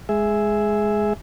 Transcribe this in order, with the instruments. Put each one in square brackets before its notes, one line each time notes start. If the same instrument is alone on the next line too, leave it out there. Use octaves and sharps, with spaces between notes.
[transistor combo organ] G#3 G#4 E5